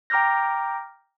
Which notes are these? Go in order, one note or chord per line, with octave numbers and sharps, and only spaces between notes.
G5 A#5 D6 F6 G6 A#6